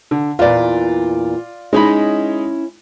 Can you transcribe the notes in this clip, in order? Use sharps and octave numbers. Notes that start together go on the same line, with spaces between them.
D3
E2 A#2 F4 D5
G#3 C#4 D#4 E4 B5